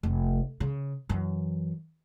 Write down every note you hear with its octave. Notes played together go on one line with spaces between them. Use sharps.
F1
C#3
F#2 E3